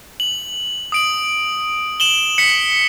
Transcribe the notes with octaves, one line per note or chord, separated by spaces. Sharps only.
F#7
D#6 D7 F#7
E7 F#7 G7
B6 C#7